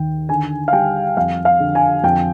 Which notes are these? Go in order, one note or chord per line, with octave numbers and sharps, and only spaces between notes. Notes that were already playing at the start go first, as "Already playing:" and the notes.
Already playing: D#2 D#3 G5
D3 G#5
F5
G3 G5
F2 F5
F5
D3
G#5
F2 G5